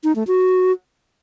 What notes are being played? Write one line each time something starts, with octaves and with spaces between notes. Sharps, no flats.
D#4
A3
F#4